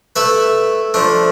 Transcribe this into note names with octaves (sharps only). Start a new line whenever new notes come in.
A3 E4 B4 E5
F3 A3 D4